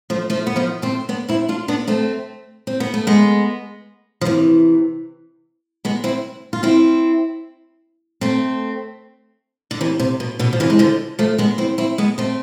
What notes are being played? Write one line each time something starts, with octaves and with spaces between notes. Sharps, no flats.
F3 A3
F3 A3
B3
F3 A3
A3 C4
B3 D4
C4 E4
D4 F4
B3 D4
A3 C4
C4
B3
A3
G#3 B3
F3
C3 E3
G#3 B3
C4 E4
F4
C4 E4
A3 C4
D3
C3 E3
C3
B2
B2 D3
F3
C3 E3
G#3
D3 F3
F3 A3
G#3 B3
C4 E4
C4 E4
G#3 B3
A3 C4